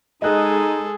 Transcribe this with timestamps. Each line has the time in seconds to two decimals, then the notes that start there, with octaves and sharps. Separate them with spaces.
0.22 G#3 D#4 G#4 A4 D#5 F#6